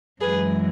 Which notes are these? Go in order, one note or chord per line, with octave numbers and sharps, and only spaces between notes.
F#2 E3 G#3 G#4 B4